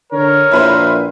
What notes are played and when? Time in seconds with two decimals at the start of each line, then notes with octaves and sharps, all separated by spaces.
0.12 D3 A#4 C#5
0.51 A#1 E4 B4 C5